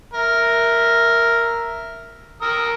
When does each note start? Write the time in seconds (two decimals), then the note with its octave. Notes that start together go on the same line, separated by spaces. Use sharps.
0.14 A#4 E5
2.42 A#4 D#6 E6